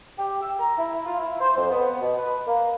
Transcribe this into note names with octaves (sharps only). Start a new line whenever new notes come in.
G4
E6
A#5
E4
F4
E4
C5
F2
B3
B2
B4
A#3